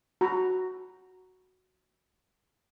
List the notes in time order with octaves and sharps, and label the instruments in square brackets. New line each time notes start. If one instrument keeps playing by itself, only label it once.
[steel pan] F#4 A#5 B5